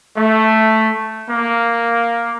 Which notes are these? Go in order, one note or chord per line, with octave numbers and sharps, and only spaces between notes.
A3
A#3